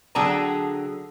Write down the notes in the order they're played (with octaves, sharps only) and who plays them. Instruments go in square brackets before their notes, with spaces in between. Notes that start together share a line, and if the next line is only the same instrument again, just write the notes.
[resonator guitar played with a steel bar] D3 F#3 G#4 G5 A5 A#5